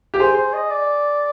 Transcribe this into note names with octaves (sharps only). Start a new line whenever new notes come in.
G4
G#4 C5
C5
D#5
D5